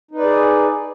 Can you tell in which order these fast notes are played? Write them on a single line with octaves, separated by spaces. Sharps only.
D#4 B4 D5 G#4